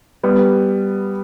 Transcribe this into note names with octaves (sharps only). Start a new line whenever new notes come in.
G3 B3